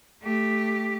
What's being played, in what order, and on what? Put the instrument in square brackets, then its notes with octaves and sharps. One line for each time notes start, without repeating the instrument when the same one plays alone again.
[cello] A3 G4